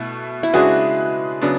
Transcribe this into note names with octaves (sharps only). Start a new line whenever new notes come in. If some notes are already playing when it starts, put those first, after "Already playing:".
Already playing: B2 A3 E4
E4
C#3 G#3 D4 F#4 G#4 B4
C#3 F#3 B3 D4